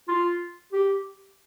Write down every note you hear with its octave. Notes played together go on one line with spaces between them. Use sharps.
F4
G4